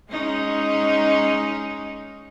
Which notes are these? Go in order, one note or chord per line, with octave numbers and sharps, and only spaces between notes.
G#3 C#4 D#4